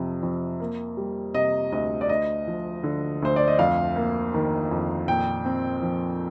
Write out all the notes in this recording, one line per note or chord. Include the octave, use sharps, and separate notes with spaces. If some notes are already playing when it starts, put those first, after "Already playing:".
Already playing: F2 C3 F3
F2
A#3
G3
C3 D#5
D2 D#5
D5
D2 D#5
F3
D3
D2 C5
D5
D#5
F2 F5
A#3
D#3
F2
A#2 G5
C4
F3